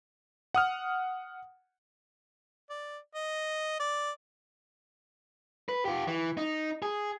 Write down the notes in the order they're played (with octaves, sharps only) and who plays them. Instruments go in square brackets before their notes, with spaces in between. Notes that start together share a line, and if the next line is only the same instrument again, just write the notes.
[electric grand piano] F#5 D#6 F6
[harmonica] D5
D#5
D5
[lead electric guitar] B4
F4 G4
E3
D#4
G#4